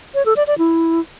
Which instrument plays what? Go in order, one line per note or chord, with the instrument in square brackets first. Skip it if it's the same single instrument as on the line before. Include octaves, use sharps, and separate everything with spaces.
[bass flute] C#5
A4
D5
D5
E4